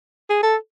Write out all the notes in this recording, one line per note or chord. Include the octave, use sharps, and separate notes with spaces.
G#4
A4